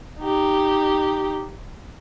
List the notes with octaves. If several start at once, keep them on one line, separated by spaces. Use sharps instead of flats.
D#4 G4